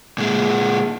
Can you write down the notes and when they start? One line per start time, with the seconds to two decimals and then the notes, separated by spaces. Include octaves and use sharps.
0.18 A#2 G#3